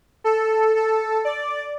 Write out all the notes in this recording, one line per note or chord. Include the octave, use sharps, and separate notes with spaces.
A4
A4
D5